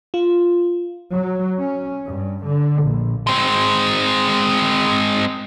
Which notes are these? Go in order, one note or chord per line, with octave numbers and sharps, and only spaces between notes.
F4
F#3
C#4
G2
D3
A#1
G#3 C4